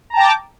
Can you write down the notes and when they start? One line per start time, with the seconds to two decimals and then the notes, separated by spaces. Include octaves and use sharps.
0.10 A#5
0.13 A5
0.17 G5
0.20 D6